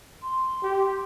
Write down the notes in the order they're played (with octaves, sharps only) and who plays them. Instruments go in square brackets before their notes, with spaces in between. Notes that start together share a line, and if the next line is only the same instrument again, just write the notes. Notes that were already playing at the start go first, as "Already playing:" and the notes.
[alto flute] C6
[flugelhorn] G4